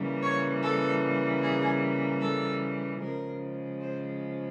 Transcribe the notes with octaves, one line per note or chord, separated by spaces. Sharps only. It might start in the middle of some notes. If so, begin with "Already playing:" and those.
Already playing: C#3 E3 G3 A#3
C#5
A4
G#4
A4
C#3 F3 G#3 A#4
C5